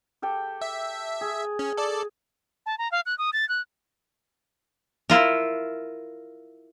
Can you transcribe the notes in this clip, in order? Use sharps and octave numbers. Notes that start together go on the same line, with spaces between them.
G4 A4 G5
E5
G#4
C#4
A4 D5
A5
A#5
F5
F#6
D#6
A6
F#6
E4 F4 A#4